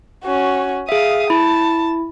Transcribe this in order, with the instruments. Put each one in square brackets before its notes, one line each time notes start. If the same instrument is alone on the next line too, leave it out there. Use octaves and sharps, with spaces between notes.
[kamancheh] C#4 F#4
[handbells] G#4 E5 [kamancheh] F5 D#6
[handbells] E4 [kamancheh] A5